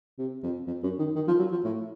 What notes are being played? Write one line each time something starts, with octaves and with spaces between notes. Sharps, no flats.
C3
F2
F2
F#2
D#3
D#3
F3
F#3
F3
A2